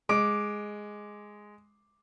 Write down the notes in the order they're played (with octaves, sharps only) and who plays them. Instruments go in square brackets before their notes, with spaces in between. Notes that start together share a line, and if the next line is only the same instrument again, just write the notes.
[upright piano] G#3 [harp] D6